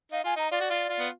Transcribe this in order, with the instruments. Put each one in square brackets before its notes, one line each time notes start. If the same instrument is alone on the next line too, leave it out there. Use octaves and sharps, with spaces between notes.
[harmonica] D#4 [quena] F5
[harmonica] F4 [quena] G#5
[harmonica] D#4 [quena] A#5
[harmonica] F4 [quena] D5
[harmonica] F#4
F4
F4
B3